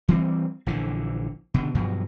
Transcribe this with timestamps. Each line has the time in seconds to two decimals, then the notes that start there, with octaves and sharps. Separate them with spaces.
0.09 E3 G3 B3 C4
0.66 A#1 D3 E3
1.54 B2 D3
1.75 G2 B2 F3 F#3